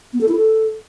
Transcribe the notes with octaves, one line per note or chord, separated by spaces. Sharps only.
B3
A4
E4
A4